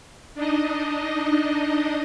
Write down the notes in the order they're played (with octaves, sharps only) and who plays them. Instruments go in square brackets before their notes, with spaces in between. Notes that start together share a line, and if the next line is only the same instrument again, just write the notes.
[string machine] D4 D#4 D#5